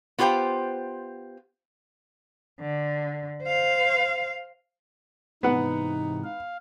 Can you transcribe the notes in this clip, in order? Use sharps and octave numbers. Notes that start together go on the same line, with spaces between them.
B3 F4 G4 C5 G5
D3
C5 F5
G#2 C3 E3 B3 D#4 F#5
F5